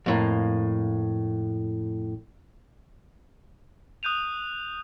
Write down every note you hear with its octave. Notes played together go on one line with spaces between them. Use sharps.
F2 A2 A#3
D#6 F#6 G6 D#7 F7